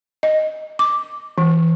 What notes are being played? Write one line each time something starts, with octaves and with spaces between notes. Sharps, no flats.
D#5
D6
E3